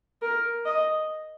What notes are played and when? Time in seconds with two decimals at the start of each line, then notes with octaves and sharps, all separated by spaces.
0.22 A#4
0.65 D#5